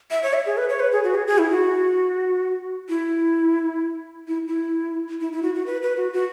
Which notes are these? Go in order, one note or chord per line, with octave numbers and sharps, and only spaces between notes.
E5
C#5
E5
G#4
B4
C#5
B4
G#4
F#4
G#4
G#4
E4
F#4
E4
E4
E4
E4
E4
F#4
F#4
B4
B4
F#4
F#4